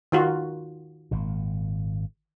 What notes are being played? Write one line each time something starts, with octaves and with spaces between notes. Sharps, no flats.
D#3 F4 F#4
G#1 A#2